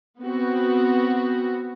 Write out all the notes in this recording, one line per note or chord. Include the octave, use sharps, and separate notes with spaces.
B3 C4 F#4